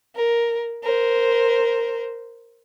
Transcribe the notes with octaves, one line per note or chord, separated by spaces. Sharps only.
A#4
A#4 C5